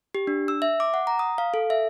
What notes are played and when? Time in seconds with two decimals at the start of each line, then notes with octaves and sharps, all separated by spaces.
0.15 G4
0.27 D4
0.48 E6
0.62 E5
0.80 D6
0.94 F#5
1.07 A#5
1.19 D#6
1.38 F5
1.54 A4
1.70 E5